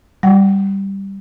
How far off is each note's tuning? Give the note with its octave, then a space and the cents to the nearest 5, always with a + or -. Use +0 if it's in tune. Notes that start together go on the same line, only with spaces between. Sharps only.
G3 +0 F#5 +10